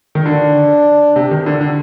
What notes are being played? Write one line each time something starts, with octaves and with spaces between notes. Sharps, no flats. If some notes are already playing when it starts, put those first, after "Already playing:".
D#3
D3 D4
C3
D#3
D3
D3